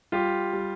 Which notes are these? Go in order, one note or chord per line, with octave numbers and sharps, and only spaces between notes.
G3 F4 G4
G3